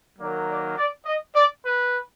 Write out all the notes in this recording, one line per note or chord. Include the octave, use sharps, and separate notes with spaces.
D#3 F#3 A#3 D5
D5
D5
D#5
D5
B4